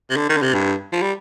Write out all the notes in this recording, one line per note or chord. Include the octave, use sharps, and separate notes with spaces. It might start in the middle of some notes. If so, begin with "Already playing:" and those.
C3
D3
D#3
D3
C3
G2
F3
G3